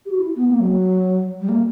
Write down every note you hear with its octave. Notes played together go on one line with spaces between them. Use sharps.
G4
F#4
E4
B3
A#3
F#3
G3
A#3